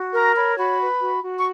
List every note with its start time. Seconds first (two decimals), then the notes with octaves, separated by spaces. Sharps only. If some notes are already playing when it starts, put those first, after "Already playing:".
Already playing: F#4
0.13 A#4 A#5
0.35 C#5 B5
0.57 F#4 B5
0.79 B4
1.01 F#4
1.23 F#4
1.36 C#6